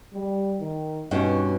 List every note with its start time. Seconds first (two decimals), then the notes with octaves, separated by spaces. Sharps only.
0.14 G3
0.61 D#3
1.11 G2 B2 C#4 D#4